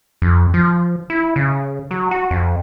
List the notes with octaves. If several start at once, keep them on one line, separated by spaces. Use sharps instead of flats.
F2
F3
E4
C#3
F#3
F#4
F2